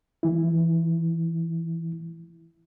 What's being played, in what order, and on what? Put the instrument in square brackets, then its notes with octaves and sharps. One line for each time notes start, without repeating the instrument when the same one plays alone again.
[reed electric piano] E3 E4